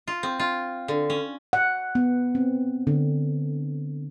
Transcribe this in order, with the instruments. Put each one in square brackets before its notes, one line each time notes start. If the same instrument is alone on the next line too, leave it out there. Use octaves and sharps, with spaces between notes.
[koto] F4
C4
F4
D3
C#4
[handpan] F#5
B3
C4
D3